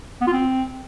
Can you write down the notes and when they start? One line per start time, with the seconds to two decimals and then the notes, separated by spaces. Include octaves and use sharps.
0.21 B3
0.27 F4
0.33 C4